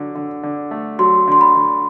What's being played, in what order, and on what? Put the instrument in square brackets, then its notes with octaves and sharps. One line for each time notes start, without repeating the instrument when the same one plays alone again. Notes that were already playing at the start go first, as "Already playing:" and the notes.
Already playing: [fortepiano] D3 F#3
D3
D3
A3
[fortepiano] F#3 [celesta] C6
[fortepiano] D3 [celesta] C6
[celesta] B5
[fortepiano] D3